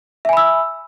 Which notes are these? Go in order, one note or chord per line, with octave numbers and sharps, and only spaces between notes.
E5 G#5 B5 E6